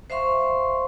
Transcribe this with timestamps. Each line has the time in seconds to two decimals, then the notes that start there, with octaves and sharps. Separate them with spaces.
0.10 C5 E5 F5 C6 C#6